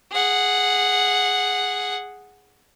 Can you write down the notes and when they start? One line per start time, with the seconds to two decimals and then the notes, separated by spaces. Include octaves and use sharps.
0.12 G#4 F#5